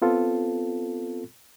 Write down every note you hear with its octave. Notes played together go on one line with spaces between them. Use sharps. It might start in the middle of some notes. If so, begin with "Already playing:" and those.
B3 C4 F4 A4